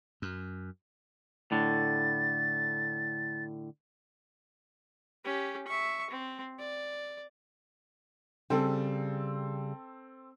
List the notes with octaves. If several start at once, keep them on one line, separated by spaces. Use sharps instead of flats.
F#2
A2 D3 A6
C#4 G4
E5 C#6
C4
D5
C#3 G3 C4 A4